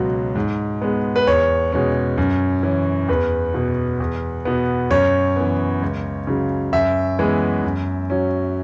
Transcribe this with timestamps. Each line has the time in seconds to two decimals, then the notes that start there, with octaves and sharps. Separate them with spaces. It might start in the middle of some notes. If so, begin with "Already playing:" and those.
Already playing: C#2 B2 F#3
0.36 G#2
0.81 G#3 B3
1.16 B4
1.27 E2 C#5
1.72 B2 G#3 C#4
2.18 F#2
2.63 E3 C#4
3.09 E2 B4
3.54 B2 B3
4.00 E2
4.45 B2 B3
4.90 F#2 C#5
5.36 E3 B3
5.82 C#2
6.27 C#3 F#3
6.73 F#2 E5
7.19 E3 G#3 B3
7.64 F#2
8.10 F#3 C#4